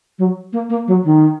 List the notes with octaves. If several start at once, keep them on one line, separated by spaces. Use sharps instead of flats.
F#3
A#3
A#3
F#3
D#3